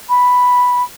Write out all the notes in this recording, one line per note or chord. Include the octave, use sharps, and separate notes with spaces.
B5